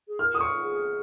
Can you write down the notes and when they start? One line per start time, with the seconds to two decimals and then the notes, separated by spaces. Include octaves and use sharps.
0.08 G#4
0.19 A#4 F6
0.35 D#6
0.41 C#6
0.62 G#4